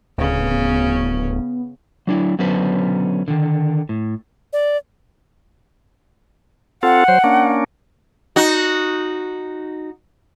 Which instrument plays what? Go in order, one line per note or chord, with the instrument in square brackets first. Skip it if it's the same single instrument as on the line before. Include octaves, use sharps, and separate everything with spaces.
[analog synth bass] D1 [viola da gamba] C#3 C#4 [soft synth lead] B3
[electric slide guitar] F#3 D4 E4
D3 F#3 B3 C#4 B4 C5
D3 D#3
A2
[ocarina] D5
[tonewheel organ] C4 F4 A4 [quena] F#5
[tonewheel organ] F#3 C5
A#3 C#4 D4
[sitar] D#4 F#4